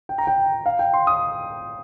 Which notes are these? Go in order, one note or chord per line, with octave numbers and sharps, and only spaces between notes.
G5
A#5
G5
F5
G5
C6
D#6